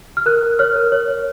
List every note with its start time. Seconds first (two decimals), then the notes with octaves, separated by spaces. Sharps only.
0.17 F6
0.26 A#4 F#6
0.42 A#4
0.59 C#5 F6
0.76 A#4
0.92 C#5
1.08 C#5